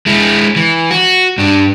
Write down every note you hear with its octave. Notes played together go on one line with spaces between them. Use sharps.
G#3 E4
E3
F#4
G2 D4